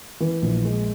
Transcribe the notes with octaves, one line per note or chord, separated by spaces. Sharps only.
E3
A#1
G#3